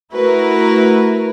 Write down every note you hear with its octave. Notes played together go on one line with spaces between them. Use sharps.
A3 E4 F#4 A#4 B4